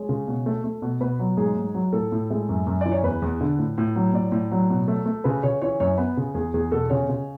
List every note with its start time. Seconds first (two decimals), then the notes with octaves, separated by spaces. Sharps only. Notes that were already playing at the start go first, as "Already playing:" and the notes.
Already playing: G#3 C#5
0.09 C#3
0.27 B2
0.46 A3
0.64 A3
0.82 B2
1.01 B2 B4
1.19 F#3
1.37 G#2 G#4
1.57 G#2
1.75 F#3
1.93 A2 A4
2.12 A2
2.31 G#3
2.49 F#2
2.67 F#2
2.81 E3 D5
2.92 C#5
3.03 E2 B4
3.22 E2
3.41 D3
3.59 A2
3.78 A2
3.96 F#3
4.13 A2 D5
4.32 A2
4.51 F#3
4.70 B2
4.88 A3
5.06 A3
5.24 C#3 B4
5.43 C#3 C#5
5.62 E3 C#5
5.80 F#2 C#5
5.98 B3 B4
6.17 C#3
6.34 E2 G#4
6.54 E2 G#4
6.72 B2 A4
6.90 C#3 C#5
7.09 C#3